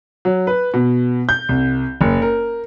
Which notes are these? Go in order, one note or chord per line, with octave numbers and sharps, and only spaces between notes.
F#3
B4
B2
G6
C2
F#1
A#4